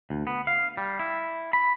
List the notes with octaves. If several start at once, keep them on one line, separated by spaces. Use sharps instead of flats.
D2
B3
F5
G3
E4
B5